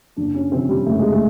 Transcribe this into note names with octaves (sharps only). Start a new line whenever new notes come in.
F#1 D4
C#4
F2 C3 D#3 C4
G3
F#1 A3
G#3
A3